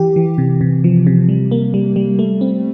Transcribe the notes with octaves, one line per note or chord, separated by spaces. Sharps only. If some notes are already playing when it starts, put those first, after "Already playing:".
Already playing: E3 G4
E3
C3
C3
F3
C3
G3
A#3
G3
G3
A3
C4